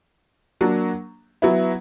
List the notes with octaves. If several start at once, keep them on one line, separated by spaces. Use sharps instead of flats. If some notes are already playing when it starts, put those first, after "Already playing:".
F#3 A#3 D4
F#3 B3 E4